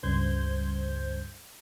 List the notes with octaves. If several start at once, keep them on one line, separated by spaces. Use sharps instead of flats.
C#2 G2 C5 G6 G#6